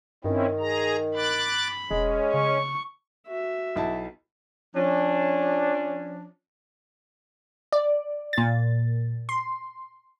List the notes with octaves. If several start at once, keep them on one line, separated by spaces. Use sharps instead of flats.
G2 D#3 C4 C#4 E4
G#4 A#5
B5 D6 F#6 A6
E1 G#3 C#4
C#3 C#6
F#4 E5
B1 E4 A5
F3 C#4 D4
D5
A#2 A6
C6